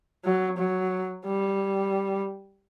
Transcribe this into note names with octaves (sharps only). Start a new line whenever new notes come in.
F#3
F#3
G3